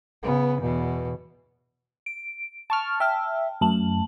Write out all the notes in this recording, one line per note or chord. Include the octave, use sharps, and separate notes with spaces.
C#3 B3
E2 B2
D7
A5 C#6 F6
E5 G5 A5 F6
F#2 A3 A5 F#7